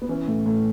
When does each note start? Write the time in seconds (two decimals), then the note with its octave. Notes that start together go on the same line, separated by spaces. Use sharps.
0.02 B3
0.09 E3 C#4
0.28 A2
0.46 A2